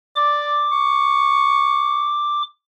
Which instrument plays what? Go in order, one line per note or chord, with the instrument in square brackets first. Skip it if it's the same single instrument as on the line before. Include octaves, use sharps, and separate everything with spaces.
[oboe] D5 [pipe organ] D6
[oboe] C#6